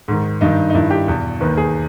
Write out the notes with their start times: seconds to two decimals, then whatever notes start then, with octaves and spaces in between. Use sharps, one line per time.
0.08 G#2 D#3
0.41 G2 D#3 D#4
0.70 D#4
0.74 G2 D#3 E4
0.91 G4
1.08 E2 B2
1.40 D#2 D#3 B4
1.57 G#4